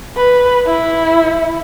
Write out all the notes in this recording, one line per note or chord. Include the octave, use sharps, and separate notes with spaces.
B4
E4